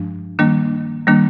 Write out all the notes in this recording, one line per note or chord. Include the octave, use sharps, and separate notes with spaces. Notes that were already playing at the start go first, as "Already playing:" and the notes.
Already playing: G2 F3 G#3 D4
D#3 G3 A#3 D4
D#3 G3 A#3 D4